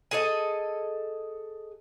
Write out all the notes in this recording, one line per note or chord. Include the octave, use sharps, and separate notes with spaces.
G#4 A4 D#5